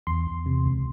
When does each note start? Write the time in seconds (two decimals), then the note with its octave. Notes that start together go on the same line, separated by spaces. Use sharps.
0.07 E2 C6
0.27 E2
0.46 C3
0.66 C#2